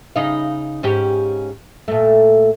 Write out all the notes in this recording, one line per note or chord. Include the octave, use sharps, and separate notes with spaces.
C#3 D#4 F5
G#2 C#4 G4
A#2 A3